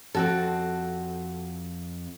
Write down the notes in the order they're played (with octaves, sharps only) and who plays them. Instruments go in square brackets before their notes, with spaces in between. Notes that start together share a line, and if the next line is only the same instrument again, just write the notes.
[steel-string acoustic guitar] F2 [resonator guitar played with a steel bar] C4 F#4 A4